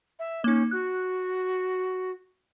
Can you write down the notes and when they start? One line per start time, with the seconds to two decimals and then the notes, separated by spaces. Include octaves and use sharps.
0.19 E5
0.44 A#3 C#4 D#4
0.71 F#4 F#6